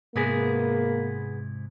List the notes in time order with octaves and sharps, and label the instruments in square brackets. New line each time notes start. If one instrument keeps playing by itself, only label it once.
[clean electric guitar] G#2 C3 E4 [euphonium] A#3 [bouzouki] B3 G#4